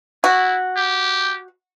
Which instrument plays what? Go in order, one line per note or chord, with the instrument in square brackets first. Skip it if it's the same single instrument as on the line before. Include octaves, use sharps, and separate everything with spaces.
[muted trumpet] E4 [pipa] F#4
[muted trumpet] G4